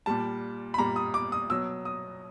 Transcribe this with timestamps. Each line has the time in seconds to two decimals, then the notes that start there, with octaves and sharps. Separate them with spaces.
0.06 A#2 G3 A5
0.74 B5
0.78 A#2 G3 A#5
0.96 D#6
1.14 D6
1.32 D#6
1.50 B2 F#3 E6
1.85 D#6